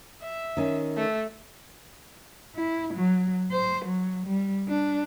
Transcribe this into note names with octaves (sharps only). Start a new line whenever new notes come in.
E5
D#3 C#4
A3
E4
F#3
C5
F#3
G3
D4